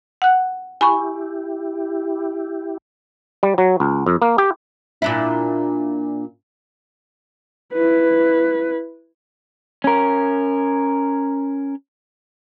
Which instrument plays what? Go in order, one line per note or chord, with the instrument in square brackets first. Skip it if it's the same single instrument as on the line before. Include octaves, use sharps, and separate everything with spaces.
[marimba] F#5 F#6
[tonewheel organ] E4 G4 [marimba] G#5 B5 C#6
[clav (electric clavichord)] G3
F#3
C#2
F2
A#3
G4
[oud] A#2 D4 E4
[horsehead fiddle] E4 B4
[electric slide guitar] C#4 A#4